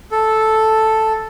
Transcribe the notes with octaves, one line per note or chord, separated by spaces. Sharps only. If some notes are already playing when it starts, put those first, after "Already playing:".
A4